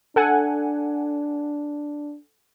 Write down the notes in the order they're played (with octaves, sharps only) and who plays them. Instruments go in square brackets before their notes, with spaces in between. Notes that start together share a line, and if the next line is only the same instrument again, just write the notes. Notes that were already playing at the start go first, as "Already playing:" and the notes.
[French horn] D4 [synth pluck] A4 F#5 G#5